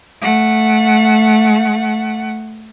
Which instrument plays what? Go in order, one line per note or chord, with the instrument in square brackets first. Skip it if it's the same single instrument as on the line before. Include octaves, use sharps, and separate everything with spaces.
[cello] A3 F#5